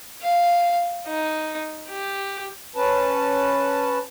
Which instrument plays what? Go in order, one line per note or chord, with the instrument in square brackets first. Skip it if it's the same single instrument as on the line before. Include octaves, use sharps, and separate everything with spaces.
[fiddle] F5
D#4
G4
[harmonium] C#4 B4 A5